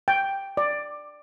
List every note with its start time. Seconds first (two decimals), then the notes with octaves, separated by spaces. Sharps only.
0.08 G5
0.57 D5